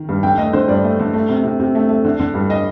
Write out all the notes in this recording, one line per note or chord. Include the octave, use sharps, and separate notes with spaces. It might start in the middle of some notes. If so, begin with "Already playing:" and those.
Already playing: D#3
G2
D3 G5
A3 D#5
D3 C5
G2 D5
A3
D3
A3
C3
C3
C3
A3
A3
D3
D3
G2
D#5